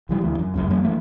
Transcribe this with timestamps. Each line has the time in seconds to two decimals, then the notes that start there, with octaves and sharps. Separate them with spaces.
0.09 C2 E3 G3
0.21 D2 E3
0.39 F#2
0.54 F#1 C#2 F#2
0.70 F#2 F#3 A#3
0.83 E3 A3 A#3